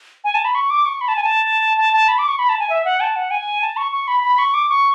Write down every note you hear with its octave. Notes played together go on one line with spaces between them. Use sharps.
G#5
A5
B5
C#6
D6
C#6
B5
A5
G#5
A5
A5
A5
B5
D6
C#6
B5
A5
G#5
E5
F#5
A5
F#5
G#5
A5
C#6
C#6
B5
B5
C#6
D6
C#6